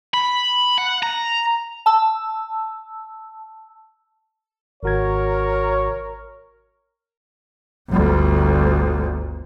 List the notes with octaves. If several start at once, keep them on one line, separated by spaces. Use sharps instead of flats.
B5
F#5
A#5
A5 E6
G#1 F#4 A#4 C#5 G#6
G1 D2